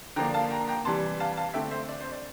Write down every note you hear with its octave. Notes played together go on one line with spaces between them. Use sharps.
D3 F3 A#3 D4 G5 A#5
F5 A5
G5 A#5
G5 A#5
C3 E3 G3 D4 A5 C6
F5 A5
F5 A5
D3 A3 C4 E5 G5
C5 E5
D5
C5
D5